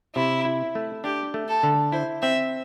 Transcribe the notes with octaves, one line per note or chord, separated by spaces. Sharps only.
C3 E4
E4
A3
D4 G4
A3
A4
D3
E4 C5
C4 E5